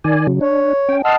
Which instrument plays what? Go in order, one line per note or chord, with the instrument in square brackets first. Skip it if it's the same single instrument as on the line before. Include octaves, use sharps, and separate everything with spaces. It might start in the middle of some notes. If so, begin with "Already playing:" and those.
[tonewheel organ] D#3 D5 G#5
C#3 F#3
[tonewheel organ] D4 [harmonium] C#5
[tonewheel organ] C#4 G5
[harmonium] D#5 F#5 A5 [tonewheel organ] C6 E6 F6